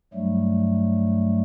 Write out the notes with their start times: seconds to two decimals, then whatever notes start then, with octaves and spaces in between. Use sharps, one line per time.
0.14 G2 F#3 G3 A3